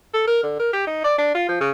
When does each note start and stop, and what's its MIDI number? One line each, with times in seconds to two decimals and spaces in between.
0.14 0.25 69
0.28 0.42 70
0.43 0.56 50
0.60 0.73 70
0.73 0.82 67
0.87 1.00 63
1.05 1.15 74
1.18 1.33 62
1.35 1.48 65
1.49 1.60 53
1.61 1.71 49